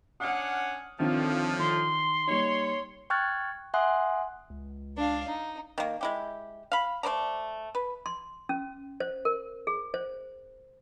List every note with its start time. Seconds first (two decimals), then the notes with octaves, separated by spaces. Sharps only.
0.20 C#4 D4 F#5 D#6 F6
1.00 A2 D3 D#3 F3 C4 D4
1.59 D#3 C6
2.27 G3 A#3 D#4 C#5
3.10 G5 C#6 F6 F#6 G#6 A6
3.74 E5 F#5 G#5 C6 D#6 F#6
4.50 C#2
4.97 D4 F5
5.28 D#4
5.78 D#3 A#3
6.01 G#3 E4 G4
6.72 F5 B5
7.03 A3 C5 D5 A#5
7.75 B4
8.06 C6
8.49 C#4
9.00 C5
9.25 A#4
9.67 G#4
9.94 C5